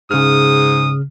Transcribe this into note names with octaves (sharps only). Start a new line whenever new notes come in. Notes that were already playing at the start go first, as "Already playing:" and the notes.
G#2 C#3 D#6 F6